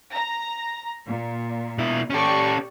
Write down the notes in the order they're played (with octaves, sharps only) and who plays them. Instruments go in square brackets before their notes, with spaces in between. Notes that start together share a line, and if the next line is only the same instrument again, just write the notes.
[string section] A#5
A#2
[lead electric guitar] B2 E4
[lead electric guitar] C#4 A4 [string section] G4 D5 C#6